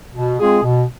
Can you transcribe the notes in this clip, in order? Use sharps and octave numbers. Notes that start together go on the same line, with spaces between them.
B2
G#3 C4 F4 G#4
B2